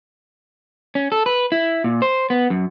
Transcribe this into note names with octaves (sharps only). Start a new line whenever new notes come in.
C#4
A4
B4
E4
A#2
C5
B3
F#2